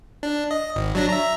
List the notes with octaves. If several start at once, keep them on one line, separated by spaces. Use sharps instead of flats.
D4
D#5
G#1
F#3 D4 A#6
E5 A#5